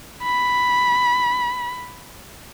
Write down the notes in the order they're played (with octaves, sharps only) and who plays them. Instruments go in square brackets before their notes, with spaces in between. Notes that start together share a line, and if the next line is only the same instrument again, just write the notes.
[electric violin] B5